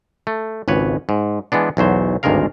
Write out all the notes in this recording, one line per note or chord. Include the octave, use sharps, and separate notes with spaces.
A3
G#1 C#2 B4 C#5
G#2
E3 G#3 B3 D4
B1 E2 F#3 C5
G#1 D2 G2 G#3 A#4 F5